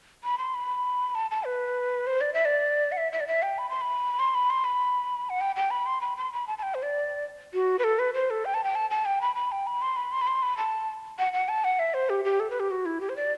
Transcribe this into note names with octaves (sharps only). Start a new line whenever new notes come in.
B5
C6
B5
A5
A5
B4
C5
D5
E5
D5
F#5
E5
E5
D5
E5
G5
B5
C6
B5
C6
B5
C6
B5
F#5
G5
G5
B5
C6
B5
C6
B5
A5
A5
G5
C5
D5
F#4
B4
A4
B4
C5
A4
G5
A5
G5
A5
A5
G5
B5
B5
G5
B5
C6
B5
C6
B5
C6
B5
A5
F#5
F#5
A5
F#5
E5
C5
G4
G4
A4
B4
G4
F#4
E4
G4
C5
D5